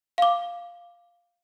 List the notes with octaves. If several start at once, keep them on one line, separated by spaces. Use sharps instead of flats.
F5 D6